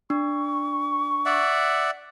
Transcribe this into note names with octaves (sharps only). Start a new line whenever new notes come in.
D4 C#6
D5 E5 F#5